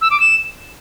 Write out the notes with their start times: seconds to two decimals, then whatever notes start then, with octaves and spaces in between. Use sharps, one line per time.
0.01 E6
0.11 D6
0.20 E7